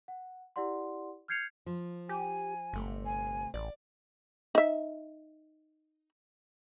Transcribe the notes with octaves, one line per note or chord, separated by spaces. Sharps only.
F#5
E4 G4 D5 F#5 C6
F6 G6 G#6 C7 C#7 F7
F3
G4 G#5
G1 C3 A3
G#5
A1 D5
D#4 E5